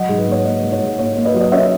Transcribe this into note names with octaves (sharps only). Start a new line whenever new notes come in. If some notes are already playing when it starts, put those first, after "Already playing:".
Already playing: F#3 D#5 F#5
G#2
B4
A#3 C#5
A#3 B4 D#5
G#2
C#5
G#2
A#3 C#5
A#3
B4 D#5
F#3
D#5
C#4 C#5 E5